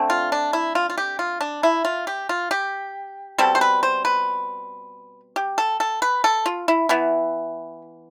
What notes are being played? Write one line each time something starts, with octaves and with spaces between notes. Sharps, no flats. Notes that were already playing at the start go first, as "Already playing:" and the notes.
Already playing: D3 A3 C4
F4
D4
E4
F4
F4
G4
F4
D4
E4
F4
G4
F4
G4
B2 G3 C4 A4
C5
B4
C5
B4
G4
A4
A4
B4
A4
F4
E4
E3 B3 E4